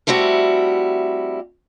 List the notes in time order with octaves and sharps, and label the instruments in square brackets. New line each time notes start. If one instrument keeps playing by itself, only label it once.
[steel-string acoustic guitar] G3 A3 C4 E4 F#4